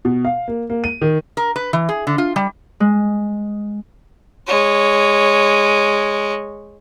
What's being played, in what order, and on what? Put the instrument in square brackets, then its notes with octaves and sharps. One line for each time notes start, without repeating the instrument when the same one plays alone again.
[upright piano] B2
F5
A#3
A#3
D#7
D#3
[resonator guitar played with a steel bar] A#4
B4
E3
G#4
D3
F4
G3
[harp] G#3
[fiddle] G#3 C#5